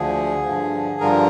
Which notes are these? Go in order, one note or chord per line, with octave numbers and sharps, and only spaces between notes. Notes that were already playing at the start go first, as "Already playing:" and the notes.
Already playing: D2 D3 F3 G#4
G2 D3 F3
G2 D3 F3 A#4